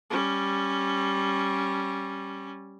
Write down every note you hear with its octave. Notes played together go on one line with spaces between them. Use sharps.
G3 C#4